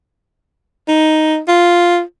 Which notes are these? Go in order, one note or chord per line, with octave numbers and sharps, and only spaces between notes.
D#4
F4